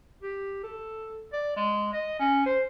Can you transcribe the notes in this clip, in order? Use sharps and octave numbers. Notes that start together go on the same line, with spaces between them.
G4
A4
D5
G#3
D#5
C#4
C5